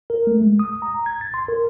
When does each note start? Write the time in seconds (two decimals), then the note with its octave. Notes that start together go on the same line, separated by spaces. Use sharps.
0.10 A#4
0.27 A3
0.42 G#3
0.59 D#6
0.82 A#5
1.06 G#6
1.21 A6
1.34 C6
1.48 A#4